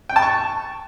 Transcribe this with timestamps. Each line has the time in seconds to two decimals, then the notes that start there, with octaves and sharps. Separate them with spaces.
0.09 G5
0.16 A5
0.22 C#6